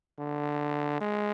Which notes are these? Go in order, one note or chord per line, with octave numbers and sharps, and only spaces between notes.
D3
G#3